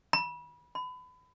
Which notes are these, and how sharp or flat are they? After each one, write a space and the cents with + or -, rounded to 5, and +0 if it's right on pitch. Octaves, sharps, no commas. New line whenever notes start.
B5 -25
B5 +30